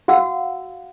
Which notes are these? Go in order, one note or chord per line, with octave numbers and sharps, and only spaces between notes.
F#4 F5 F#5 E6